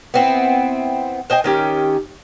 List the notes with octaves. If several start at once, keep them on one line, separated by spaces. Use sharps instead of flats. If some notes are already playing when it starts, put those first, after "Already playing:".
B3 C4 E4
C5 D#5 G5 G#5
D#3 C#4 G4